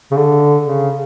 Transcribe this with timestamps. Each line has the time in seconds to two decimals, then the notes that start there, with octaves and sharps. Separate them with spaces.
0.11 C#3
0.16 D3
0.62 C#3